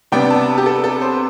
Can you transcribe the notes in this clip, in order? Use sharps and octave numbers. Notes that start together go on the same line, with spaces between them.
C3 G3 B3 D4 G5
A5
G4
A4
A4
C5